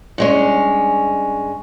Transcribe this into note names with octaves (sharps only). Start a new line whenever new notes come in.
G2 G#3 C#4